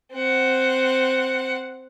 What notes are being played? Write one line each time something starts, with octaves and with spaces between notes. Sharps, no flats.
C4 F#5